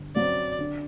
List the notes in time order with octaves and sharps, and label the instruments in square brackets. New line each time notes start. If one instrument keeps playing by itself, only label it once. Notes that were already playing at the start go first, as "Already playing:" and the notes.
Already playing: [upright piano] G1
[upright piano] F#2 F#3 C4 [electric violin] D5
[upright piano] D3